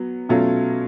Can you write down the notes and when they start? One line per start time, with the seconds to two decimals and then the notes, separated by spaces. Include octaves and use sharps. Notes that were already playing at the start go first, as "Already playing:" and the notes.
Already playing: F#3 B3
0.29 B2 F#3 A3 C#4 F4